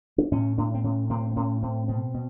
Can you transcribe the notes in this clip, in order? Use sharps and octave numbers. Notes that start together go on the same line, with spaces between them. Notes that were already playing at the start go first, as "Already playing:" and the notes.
D4
A2 C#4
A2 D4
C4
A2 C#4
A2 C4
C4
A2 C#4
A2 C4
B2 C4
B2